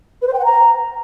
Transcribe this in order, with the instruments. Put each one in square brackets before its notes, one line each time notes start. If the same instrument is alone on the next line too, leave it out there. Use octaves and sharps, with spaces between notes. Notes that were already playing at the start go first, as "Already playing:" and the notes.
[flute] B4
C5
G5
F#5
A#5